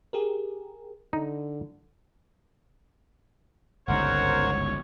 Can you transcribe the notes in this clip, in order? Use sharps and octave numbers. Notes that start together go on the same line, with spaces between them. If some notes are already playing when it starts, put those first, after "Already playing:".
G4 G#4 A#4
D3 D#4
G1 C#2 G#2 A#4 C5 C#5 F#5